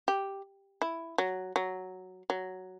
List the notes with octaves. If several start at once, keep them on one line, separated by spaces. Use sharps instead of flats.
G4
E4
F#3
F#3
F#3